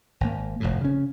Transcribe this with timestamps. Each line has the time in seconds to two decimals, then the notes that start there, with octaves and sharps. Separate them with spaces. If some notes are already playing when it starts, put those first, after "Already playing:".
0.21 G#1 A#3
0.60 F1 F2 A2
0.81 C#3 C#4